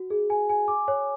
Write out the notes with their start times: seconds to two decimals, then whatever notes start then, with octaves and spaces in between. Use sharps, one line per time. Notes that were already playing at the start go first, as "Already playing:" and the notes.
Already playing: F#4
0.10 G#4
0.30 G#5
0.49 G#5
0.68 D6
0.88 C#5